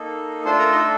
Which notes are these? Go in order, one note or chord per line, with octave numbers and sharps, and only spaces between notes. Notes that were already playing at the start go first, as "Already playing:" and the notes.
Already playing: A#3 D#4 A4
A3 D4 F4 A4 C5 C6
A#4 A#5
D#4 D#5